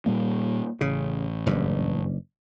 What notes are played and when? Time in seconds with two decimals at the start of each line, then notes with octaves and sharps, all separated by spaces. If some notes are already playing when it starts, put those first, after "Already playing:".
0.06 A#2 G3 A#3
0.81 A1 C#3
1.46 F#1 G2